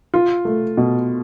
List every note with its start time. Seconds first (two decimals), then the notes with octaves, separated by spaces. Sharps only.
0.14 F4
0.45 A3
0.77 B2